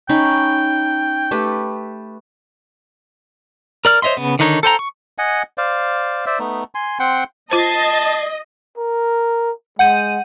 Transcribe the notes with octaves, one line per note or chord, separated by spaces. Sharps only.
C#4 D#4 G5 B5
A3 G4 B4
A#4 D5 F6
C5 C#5 D#5 E5 C6
C#3 B3
D3 D#3 D4 D#4 C#5
A4 C5 G5 A#5
C#6
D#5 F#5 G#5
C5 D5 F5
C5 D5 E5
A3 B3 D#4
G#5 C6
C4 F#5 G5 C6
F4 C5 D#5 A5 G#6 A6 C7
A#4
G#3 F#5 G6 D#7